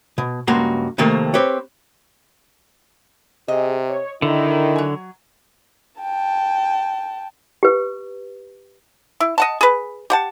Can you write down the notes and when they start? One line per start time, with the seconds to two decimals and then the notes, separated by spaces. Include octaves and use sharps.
0.18 B2
0.47 C#2 G2 A#3 F#4 A#5 C6
0.98 F2 C3 D#3 A3 A#3
1.34 C4 G4 B4 C#5
3.48 C3 G#4 D#5
3.90 C#5
4.22 D3 D#3 E4
4.76 F#3 G#5
6.01 G5 A5
7.63 G4 B4
9.20 E4
9.38 D#5 F#5 A5
9.61 G#4 B4
10.10 G4 F#5 A5